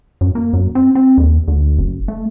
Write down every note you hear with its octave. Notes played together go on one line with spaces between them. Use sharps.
F#2
A#3
F#2
C4
C4
D#2
D2
F#1
A3